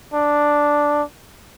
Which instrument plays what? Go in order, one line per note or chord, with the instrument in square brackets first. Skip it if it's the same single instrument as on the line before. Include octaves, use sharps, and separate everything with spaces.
[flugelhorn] D4